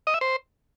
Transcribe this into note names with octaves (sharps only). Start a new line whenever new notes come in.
D#5
E5
C5